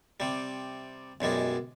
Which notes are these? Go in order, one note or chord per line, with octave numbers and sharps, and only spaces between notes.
C3 G3
B1 F#2 G3 G#3